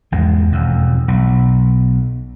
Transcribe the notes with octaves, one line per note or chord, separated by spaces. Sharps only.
G#1 E2 G#3
E1 F2 G#2
B1